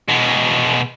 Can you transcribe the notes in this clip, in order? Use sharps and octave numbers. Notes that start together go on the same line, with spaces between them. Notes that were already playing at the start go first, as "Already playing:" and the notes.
B2 G#3